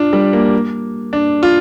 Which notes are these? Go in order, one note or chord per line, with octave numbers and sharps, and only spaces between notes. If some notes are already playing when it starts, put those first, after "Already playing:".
Already playing: D4 F4
G3
A#3
D4
F4